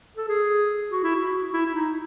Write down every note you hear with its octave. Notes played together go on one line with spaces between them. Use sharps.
A4
G#4
F#4
E4
F#4
E4
E4
D#4